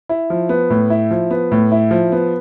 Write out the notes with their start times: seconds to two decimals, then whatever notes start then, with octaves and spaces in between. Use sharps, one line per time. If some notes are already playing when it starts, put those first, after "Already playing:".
0.09 E4
0.30 F3
0.49 B3
0.70 A2
0.90 E4
1.11 F3
1.31 B3
1.52 A2
1.72 E4
1.91 F3
2.12 B3